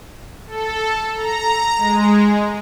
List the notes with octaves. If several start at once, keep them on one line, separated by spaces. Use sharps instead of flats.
A4
A#5
G#3